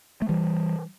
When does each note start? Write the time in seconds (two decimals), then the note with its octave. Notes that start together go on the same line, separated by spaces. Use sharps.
0.22 A3
0.29 E3 G3